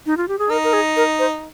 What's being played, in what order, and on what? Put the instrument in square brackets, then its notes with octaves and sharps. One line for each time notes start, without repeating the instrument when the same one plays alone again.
[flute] D#4
F4
G4
G#4
[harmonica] D#4 [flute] A#4
[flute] A#4
G#4
A#4
C5